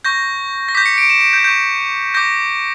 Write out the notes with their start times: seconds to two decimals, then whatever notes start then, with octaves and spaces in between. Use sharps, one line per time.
0.05 C#6 G6 A#6
0.69 A#6
0.75 D6 G6 B6
0.86 C#7
0.98 D7
1.10 E7
1.21 D7
1.33 G6
1.44 C#6 G6
2.14 D6 G6 A#6